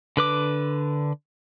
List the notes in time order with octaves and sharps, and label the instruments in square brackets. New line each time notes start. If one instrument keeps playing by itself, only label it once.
[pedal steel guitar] D3 B4 D6